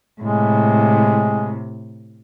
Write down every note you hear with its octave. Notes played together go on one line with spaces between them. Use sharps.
A2 C3 G#3